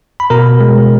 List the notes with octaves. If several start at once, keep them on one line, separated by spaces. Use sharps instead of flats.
B5
B2 A#4 A#5
G#3